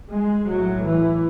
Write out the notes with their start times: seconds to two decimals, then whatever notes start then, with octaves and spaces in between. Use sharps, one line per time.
0.11 G#3
0.47 B1 A2 F#3
0.84 E3